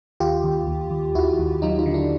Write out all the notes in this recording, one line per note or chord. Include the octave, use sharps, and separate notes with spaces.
D#2 F4 G4
D#2
D#2
D#2
D#2 E4 F#4
D#2
F#3 D#4 F4
D#4 F4
D3
D4 E4